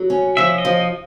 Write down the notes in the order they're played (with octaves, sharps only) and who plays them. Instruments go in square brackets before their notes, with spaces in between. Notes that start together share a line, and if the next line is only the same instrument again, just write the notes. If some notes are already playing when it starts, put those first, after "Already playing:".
Already playing: [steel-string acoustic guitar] F#3
C#4
[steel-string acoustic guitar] F3 [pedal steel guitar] E5
[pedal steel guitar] D#5
[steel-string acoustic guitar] F3